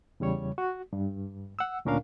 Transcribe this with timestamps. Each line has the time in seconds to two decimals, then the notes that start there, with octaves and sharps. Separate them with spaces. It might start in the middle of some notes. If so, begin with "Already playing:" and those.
0.20 E2 C#3 G3 C#5
0.58 F#4
0.93 G2
1.59 F#5 E6
1.85 D2 A#2 C#4 D4 A#4 F5